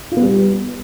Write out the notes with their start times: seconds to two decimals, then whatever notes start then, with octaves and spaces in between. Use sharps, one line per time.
0.12 F4
0.17 B3
0.22 G3